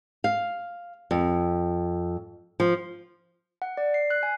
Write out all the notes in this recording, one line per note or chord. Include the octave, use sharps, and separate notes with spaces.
F5
F2
F3
F#5
D5
C7
F#6
G#5